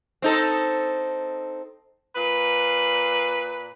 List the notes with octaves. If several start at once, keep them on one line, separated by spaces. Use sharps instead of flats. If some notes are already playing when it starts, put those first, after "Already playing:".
C4 D#4 A4
A#2 B4